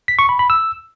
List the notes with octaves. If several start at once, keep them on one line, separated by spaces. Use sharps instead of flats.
B6
C#6
B5
B5
E6